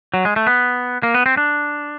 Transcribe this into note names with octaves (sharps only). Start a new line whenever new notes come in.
F#3
G#3
A3
B3
A#3
B3
C4
D4